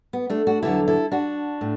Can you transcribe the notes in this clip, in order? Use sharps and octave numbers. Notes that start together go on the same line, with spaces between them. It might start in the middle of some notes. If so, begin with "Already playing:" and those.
B3
A3 D4
D4 F#4
E2 D3 F#3 E4 A4
E4 A4
D4 F#4
A2